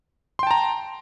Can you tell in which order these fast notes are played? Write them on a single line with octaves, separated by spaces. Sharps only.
C6 G5 A5 A#5